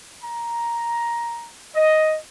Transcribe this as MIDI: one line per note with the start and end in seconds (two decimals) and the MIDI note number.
0.23 1.50 82
1.74 2.17 75